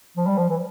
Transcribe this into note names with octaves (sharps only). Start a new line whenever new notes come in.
F3
G3
F3
E3